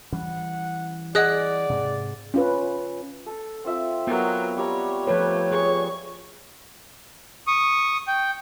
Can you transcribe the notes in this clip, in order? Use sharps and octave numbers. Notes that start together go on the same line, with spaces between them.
E3 G3 C#4 F#5
G#4 D5 D#5 F#5 D#6 F#6
G#2 C3
C#4 F4 B4
A4
C4 F4 E5
F#3 B3 A#4
G3 C#5 D5 A#5
F3 A3 G4 B4 C#5
G#4 C#6
C#6 D#6
G5